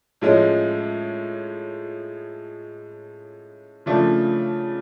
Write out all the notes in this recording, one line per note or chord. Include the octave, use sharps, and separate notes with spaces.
A2 F3 G#3 C#4
C#3 F3 A3 D4